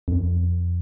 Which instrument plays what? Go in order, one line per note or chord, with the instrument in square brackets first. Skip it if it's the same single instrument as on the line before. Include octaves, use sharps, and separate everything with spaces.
[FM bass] F2